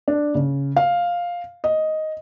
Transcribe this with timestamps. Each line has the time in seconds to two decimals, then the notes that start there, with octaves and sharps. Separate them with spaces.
0.08 D4
0.35 C#3
0.76 F5
1.64 D#5